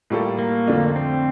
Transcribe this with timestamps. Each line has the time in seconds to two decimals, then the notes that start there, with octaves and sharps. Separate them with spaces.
0.10 A2 G3 A#3 F4 A4
0.39 A#3
0.67 F2 D3 A3 D4 F4
0.96 C4